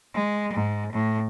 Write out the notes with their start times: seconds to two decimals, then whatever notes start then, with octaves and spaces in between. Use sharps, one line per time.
0.14 G#3
0.53 G#2
0.93 A2